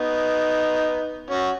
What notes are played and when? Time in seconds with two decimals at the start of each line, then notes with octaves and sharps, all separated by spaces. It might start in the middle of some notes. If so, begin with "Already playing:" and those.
Already playing: B3 D#4
1.30 C#4 F#4